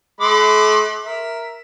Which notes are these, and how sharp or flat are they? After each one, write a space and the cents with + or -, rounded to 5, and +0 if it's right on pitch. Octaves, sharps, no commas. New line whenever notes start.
A3 -45 B5 +45 D6 +20
A#4 +0 E5 +0